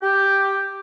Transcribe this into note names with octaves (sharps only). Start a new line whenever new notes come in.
G4